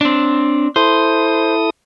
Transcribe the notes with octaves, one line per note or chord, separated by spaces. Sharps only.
C4 D4
E4 A4 C5 D#6